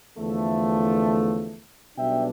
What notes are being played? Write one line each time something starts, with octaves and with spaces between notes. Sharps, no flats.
E2 D3 F3 A3
B1 B2 G3 D4 E5 G5